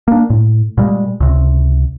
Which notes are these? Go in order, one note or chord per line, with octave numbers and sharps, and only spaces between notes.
A#3 D4
A2
A#2 G3 G#3
C#2 C3